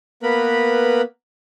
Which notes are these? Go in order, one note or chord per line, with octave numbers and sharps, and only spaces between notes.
A#3 B3 A#4 B4 B5